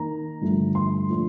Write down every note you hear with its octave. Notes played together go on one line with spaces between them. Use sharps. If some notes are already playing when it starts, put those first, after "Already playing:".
Already playing: D#3 A#3 D#4 A#5
G2 D3 F3 A3
C6
A#2 F3 A3 D4